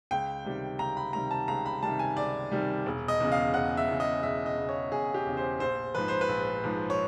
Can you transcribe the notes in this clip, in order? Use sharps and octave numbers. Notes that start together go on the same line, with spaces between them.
C#2 G5
C3 D#3 G3
C#2 A#5
B5
C3 D#3 G3 A#5
A5
C#2 A#5
B5
C3 D#3 G3 A5
G#5
C#2 D5
C3 D#3 G3
E1
D#5
E2 C#3
F5
E1 F#5
E5
E2 C#3
D#5
E1 E5
D#5
E2 C#3
C#5
E1 G#4
G4
E2 C#3
C5
A#1 C5
G#2 F3 B4
C5
B4
A#1
G#2 F3
C#5